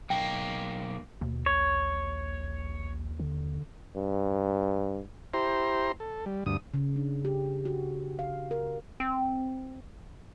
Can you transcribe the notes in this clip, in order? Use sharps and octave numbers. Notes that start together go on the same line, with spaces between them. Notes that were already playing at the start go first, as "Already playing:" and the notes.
B1 A#3 G5
D#2 B2
A#1 C#5
D3
G2
E4 G4 C5 A#5 C6
A4
G3
D2 G2 D#6
C#3
D4
G4
F#4
F5
A#4
C4